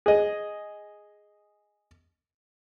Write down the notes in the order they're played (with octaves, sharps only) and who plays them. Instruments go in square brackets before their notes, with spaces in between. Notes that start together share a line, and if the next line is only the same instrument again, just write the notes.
[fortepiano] G#4 D#5